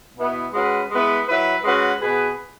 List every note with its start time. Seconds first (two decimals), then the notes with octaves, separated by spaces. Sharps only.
0.18 B2 B3 E4
0.53 G#3 C#4 F#4 B4
0.90 G#3 B3 E4 B4
1.28 F#3 E4 B4
1.64 G#3 C#4 F#4 B4
2.00 B2 B3 G#4 B4